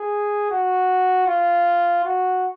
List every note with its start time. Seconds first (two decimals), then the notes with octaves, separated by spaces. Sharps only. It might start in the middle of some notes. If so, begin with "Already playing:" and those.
Already playing: G#4
0.51 F#4
1.27 F4
2.05 F#4